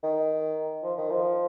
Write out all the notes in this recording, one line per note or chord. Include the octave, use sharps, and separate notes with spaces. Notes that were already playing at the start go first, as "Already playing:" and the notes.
D#3
F3
D#3
F3